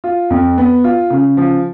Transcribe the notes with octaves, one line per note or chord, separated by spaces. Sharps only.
F4
F2
B3
F4
C#3
F3